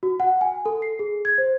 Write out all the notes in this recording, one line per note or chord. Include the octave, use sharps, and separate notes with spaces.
F#4
F#5
G#5
A4
C7
G#4
G#6
C5